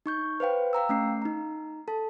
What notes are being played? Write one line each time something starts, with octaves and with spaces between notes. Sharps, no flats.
D#4 C#6 G6
B4 C5 F5 G5
F5 G5 A#5 E6
A3 C#4 C7
D#4 A#5
A4 A5